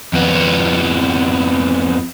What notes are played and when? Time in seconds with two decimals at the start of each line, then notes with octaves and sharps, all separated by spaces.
0.13 F2 B3